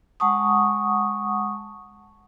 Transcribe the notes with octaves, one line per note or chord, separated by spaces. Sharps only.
G#3 F#5 A5 C#6 D#6